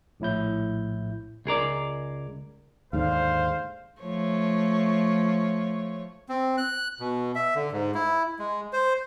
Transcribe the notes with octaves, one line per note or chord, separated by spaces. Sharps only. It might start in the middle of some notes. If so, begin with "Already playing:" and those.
A#1 A2 E4 G6
C#2 G#4 A#4 D5
D#2 G#2 D3 C5 F5
F3 A3 C#5
C4
F#6
B2
E5
D3
G#2
E4
G#3
C5